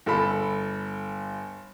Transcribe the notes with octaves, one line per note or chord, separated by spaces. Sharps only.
G1 A4 B5